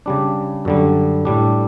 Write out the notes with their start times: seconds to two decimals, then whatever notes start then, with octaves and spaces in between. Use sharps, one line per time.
0.06 C#3 G3 D4
0.65 F#2 D3 G3
1.25 A2 G3 D4